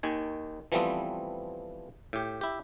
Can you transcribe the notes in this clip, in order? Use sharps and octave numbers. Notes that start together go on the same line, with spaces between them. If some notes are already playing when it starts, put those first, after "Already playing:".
D#2 D#3 G#5
E3 F3 G3 A3 B3 C4
A2 G4
E4 G4